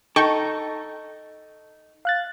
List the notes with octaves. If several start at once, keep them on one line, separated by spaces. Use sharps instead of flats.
D#4 A4 G5 C#6
F5 F#6 A6